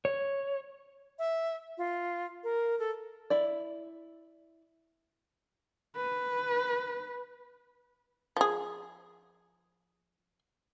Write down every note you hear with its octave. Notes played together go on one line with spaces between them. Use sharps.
C#5
E5
F4
A#4
A4
E4 D5
B4
F3 G#4